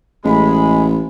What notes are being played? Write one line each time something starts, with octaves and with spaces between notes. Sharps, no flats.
A1 G#3 B5